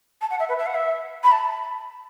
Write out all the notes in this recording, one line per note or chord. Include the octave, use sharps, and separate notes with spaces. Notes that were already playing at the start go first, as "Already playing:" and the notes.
A5
F#5
E5
B4
E5
F#5
E5
B5
A5